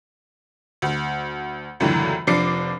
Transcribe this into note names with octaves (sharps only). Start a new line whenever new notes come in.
D2
C#2 F#2 A2 D3 E3
F1 F3 D4 D6 C7 C#7